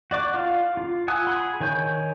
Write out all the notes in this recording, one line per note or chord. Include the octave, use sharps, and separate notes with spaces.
F#4 D5 D6
F4 F5 C6 F6
F4
F#5 G#5 D#6 E6
G#4 G#5 B5 C6
D#3 C#5 G#5 G6